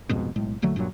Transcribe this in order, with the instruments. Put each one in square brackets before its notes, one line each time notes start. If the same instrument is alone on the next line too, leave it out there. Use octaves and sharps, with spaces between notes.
[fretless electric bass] C2 F2 G#2 B2
B1 A2 G#3
A#1 D3 F#3 A3
G2 A#2 C#3 F#3